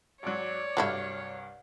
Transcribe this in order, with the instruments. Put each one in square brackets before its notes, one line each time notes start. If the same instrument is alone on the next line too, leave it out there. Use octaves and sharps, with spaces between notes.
[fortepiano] G#1 F#3 [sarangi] C#5 [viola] D5
[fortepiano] C2 G2 F5 [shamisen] F#3 A3 E4